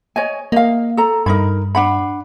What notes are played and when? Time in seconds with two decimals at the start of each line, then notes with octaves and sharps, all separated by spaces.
0.16 C#5 D#5 G#5
0.52 A#3 D#5 F5
0.97 A4 A#5
1.26 G2 D#4 A#4 B5
1.75 D4 F#5 B5